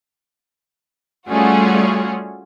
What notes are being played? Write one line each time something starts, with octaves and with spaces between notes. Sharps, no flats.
G3 A3 C#4 F4 F#4 G#4